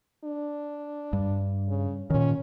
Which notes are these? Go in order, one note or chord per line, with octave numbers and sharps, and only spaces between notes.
D4
G2
C#3
A#2 D#3 C#4